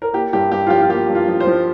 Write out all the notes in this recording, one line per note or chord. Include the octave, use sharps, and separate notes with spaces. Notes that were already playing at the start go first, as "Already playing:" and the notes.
A#4
A#3 G4
G2 G4
G2 G4
F4
F3 G4
F4
A#3 G4
G2
F4
F3
C5
F3